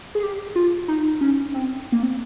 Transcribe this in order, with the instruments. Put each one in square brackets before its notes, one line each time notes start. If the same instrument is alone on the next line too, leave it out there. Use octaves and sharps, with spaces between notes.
[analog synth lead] G#4
G4
F4
D#4
C#4
C4
A#3
C4